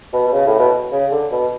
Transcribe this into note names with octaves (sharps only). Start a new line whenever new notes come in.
B2
B2
C#3
A2
B2
C#3
D3
B2